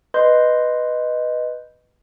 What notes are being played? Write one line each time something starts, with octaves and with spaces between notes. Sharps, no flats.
B4 D#5 C6 G6